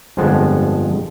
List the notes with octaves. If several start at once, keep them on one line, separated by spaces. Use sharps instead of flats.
G1 F2 F3 G#3 F#5 A5